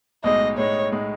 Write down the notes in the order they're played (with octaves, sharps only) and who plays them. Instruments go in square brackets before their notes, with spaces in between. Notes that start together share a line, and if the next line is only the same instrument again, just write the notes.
[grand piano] B1 A2 G#3 D#4 [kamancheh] D#5
[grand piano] B1 A2 G#3 D#4 [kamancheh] C#5
[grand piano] A2 G#3 D#4